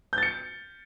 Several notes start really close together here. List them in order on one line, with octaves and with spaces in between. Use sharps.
G6 A6 C#7